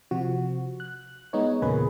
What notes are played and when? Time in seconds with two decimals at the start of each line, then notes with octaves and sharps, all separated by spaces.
0.11 C3 F3 F#4
0.80 F#6
1.33 G#3 B3 D#4 C#5
1.62 E2 A#2 C#3 A#3 G#4 B4